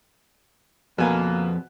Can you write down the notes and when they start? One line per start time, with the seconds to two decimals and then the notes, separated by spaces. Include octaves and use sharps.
0.98 F2 B2 A#3 B4 G#5